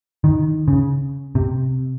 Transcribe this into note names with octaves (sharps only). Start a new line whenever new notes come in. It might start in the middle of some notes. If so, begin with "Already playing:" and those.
D#3
C#3
C3